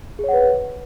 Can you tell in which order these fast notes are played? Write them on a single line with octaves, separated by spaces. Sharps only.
G#4 C#5 F#5 B4